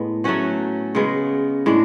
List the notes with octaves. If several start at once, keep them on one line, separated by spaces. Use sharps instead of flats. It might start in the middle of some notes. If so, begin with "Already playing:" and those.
Already playing: A2 G#3 B3
F#3 A3 C#4 F#4
C#3 G#3 B3
A2 G#3 D4